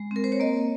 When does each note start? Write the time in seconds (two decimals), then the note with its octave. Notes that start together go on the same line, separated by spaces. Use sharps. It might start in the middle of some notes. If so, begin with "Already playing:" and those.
Already playing: G#3
0.11 C4 A#4
0.24 C5
0.32 C#5
0.40 A#3 D#5